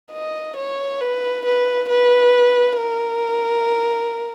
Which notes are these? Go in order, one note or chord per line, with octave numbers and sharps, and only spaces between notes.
D#5
C#5
B4
B4
B4
A#4